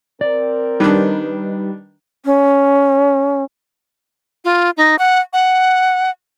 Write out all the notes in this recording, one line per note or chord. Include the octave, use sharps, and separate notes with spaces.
C4 A#4 D5
D#3 G3 D4 D#4 B4
C#4
F4
D#4
F#5
F#5